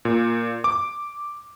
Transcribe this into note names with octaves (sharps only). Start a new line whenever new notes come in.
A#2
D6